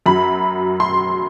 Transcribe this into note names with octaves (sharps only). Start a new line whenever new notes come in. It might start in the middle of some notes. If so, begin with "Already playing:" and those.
F#2 F#3 B5
C6